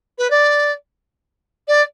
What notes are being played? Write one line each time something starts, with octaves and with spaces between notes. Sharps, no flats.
B4
D5
D5